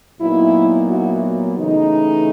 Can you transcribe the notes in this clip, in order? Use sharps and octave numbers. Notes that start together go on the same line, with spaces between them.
A#2 F#3 B3 D#4 E4
E4 F#4
C#3 E3 A3 D#4